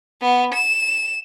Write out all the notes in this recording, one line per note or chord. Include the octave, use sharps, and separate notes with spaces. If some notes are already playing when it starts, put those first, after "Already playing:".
B3
E7